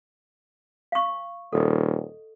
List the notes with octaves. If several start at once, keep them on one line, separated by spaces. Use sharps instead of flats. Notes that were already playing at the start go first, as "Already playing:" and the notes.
F5 C#6
D#1 A4 D#5